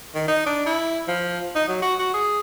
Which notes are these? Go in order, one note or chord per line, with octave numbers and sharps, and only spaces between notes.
D#3
D#4
D4
E4
F3
D#4
F#3
F#4
F#4
G#4